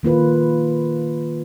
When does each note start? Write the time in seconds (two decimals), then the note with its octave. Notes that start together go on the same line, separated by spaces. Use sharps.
0.03 D#3 A#3 F4 B4